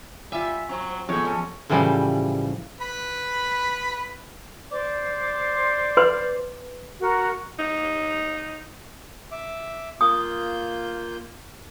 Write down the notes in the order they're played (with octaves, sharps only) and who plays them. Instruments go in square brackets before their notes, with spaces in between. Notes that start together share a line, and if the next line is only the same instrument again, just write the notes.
[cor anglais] G3 [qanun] F4 G#5 [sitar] E5
[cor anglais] F#3 [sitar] C4
[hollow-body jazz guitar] F2 [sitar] A2 [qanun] G#3 B3 [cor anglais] C#5
[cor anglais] C#4 [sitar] A4
[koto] A2 C#3 E3 F3 G3
[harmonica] B4 B5
[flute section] C5 D5 D6
[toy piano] B4 C6
[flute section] F#4 A#4 F#5
[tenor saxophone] D#4
[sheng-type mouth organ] E5 D6
[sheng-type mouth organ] A#3 F4 G6 [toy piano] D#6